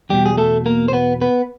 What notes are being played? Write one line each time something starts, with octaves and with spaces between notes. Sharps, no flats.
E2 B2 G3 G4
G#4
A3 A4
A#3 A#4
C5
B3 B4
B3 B4